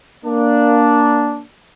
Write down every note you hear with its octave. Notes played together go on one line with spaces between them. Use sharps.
A#3 D4